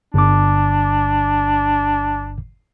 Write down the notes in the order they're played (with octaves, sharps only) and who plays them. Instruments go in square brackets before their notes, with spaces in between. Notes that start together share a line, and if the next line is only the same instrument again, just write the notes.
[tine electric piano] G1 D6 [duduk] D4